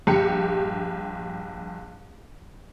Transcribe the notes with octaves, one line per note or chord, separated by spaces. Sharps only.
A#1 G2 G4 C#7